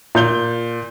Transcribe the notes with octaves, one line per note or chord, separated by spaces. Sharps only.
A#2 G6 G7